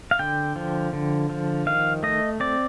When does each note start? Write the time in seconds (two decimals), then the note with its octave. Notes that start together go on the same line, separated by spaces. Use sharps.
0.11 F5
0.19 D3 G5
0.56 F3
0.93 D3
1.30 F3
1.66 D#3 F5
2.03 A3 D#5
2.40 C4 D5